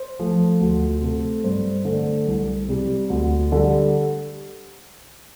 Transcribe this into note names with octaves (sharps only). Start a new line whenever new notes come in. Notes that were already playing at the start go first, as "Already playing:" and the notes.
Already playing: C5
F3 A3
D2
C3 A3
G2 C5
D3 A3
C2
C3 G3
D2
D3 G3